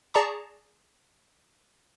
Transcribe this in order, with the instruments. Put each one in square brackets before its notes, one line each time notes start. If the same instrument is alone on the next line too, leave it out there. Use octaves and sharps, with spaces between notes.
[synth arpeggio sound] G#4 D5 A5 A#5 C#6